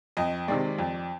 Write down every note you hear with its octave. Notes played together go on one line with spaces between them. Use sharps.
F2 D#5
C3 D#3 G#3 D5
F2